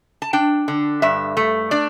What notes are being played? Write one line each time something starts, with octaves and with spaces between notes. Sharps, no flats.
A5
D4 G5
D3
G2 E5
A3
D4 D5